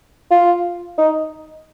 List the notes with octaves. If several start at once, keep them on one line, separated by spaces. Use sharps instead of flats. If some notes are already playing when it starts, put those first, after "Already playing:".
F4
D#4